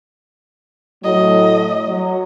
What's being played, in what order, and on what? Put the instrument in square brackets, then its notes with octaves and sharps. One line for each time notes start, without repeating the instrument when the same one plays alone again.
[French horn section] A2 F#3 [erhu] D#5
[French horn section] F#3